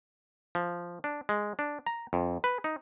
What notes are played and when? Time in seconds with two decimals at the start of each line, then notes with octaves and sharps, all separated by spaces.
0.55 F3
1.04 D4
1.29 G#3
1.59 D4
1.87 A#5
2.13 F2
2.44 B4
2.64 D#4